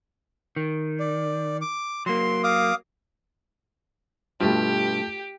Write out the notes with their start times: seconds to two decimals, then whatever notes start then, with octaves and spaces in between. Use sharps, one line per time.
0.56 D#3
1.00 D5
1.61 D6
2.06 F#3 A#3 C6
2.44 F5 D6 D#6
4.41 G2 B2 A3 F4 G4